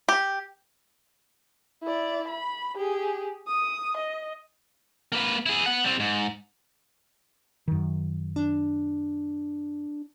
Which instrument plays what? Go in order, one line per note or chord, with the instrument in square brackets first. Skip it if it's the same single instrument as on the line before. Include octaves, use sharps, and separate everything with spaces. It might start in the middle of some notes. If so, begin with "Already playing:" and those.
[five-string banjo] G4
[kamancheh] E4 D5
B5
G4 G#4
D#6
D#5
[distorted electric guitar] A#3 B4
E4 G#4
B3 F#5
G3 C4
G#2
[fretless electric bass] F#2 D#3
[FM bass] D4